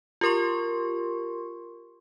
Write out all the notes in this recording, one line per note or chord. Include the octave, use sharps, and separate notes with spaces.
F4 G4 A#4 C6 C#6